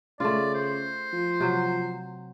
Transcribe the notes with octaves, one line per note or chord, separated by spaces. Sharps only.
C#3 A3 F4 D5
C5
F3
C3 F#3